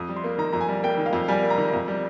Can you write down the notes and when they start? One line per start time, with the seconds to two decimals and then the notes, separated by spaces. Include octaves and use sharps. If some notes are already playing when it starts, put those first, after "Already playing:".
Already playing: F2 D#6
0.09 G3
0.16 C6
0.24 A#3
0.38 D#3 A#5
0.53 F2 A#5
0.61 G#5
0.69 G3
0.83 A#3 G5
0.98 D#3
1.06 F5
1.13 F2
1.28 G3 G#5
1.43 A#3
1.50 A#5
1.58 D#3
1.73 F2
1.88 G3